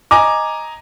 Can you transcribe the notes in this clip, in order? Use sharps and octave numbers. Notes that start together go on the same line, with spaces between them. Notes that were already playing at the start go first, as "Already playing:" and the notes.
D#5 G#5 A#5 D6